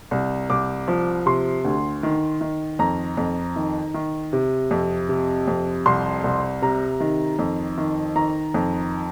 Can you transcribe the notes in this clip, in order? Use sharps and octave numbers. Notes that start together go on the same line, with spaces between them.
C2
C2 D6
F3
C3 C6
D2
D#3
D#3
F2 A#5
F2
D#3
D#3
C3
F2
C3
F2
C2 C6
C2
C3 A#5
D#3
F2
D#3
D#3 A#5
F2